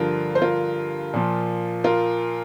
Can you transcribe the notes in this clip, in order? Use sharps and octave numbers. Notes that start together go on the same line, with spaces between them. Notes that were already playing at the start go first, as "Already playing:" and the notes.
Already playing: G2 D3 F3 F4 A#4
C5
F4 A#4
A#2 F3
F4 A#4